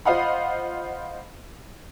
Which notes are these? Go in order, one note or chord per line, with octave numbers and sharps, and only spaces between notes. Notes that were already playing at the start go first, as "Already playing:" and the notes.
F4 C5 D#5 F5 F#5 B5